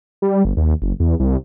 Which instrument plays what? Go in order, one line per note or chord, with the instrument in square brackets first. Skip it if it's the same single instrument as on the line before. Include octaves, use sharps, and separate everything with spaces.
[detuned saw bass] G3
G1
D#2
F#1
E2
C2